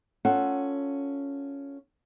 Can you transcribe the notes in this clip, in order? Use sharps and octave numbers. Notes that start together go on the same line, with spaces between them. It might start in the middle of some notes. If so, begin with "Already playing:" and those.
C#4 F4 A4 F#5